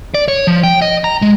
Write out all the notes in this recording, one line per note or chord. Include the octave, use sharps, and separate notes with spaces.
D5
C#5
F3
G5
D#5
A#5
G#3